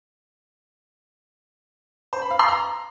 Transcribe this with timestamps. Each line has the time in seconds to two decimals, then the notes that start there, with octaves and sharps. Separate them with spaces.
2.13 C5
2.22 B5
2.30 F5
2.39 C6
2.48 A#5